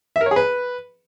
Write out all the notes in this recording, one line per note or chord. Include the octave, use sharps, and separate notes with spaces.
E5
A#4
C#5
G#4
B4